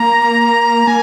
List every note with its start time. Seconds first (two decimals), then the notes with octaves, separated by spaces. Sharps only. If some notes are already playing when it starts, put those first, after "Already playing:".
Already playing: A#3 A#5
0.87 A#3 G#5